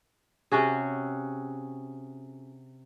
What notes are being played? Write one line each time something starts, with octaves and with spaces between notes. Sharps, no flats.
C3 C#4 F#4 G#4